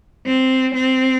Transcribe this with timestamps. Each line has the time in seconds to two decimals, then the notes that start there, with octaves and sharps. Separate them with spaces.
0.26 C4
0.74 C4